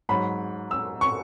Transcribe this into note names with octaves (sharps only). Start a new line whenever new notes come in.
G#2 F#3 B5
E6
C#6